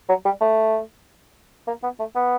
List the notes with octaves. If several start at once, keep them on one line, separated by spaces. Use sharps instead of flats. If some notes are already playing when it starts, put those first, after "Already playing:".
F#3
G3
A3
A#3
B3
A3
B3